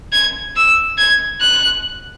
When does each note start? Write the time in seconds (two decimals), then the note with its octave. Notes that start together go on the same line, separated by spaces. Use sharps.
0.12 G#6
0.56 E6
0.98 G#6
1.41 F#6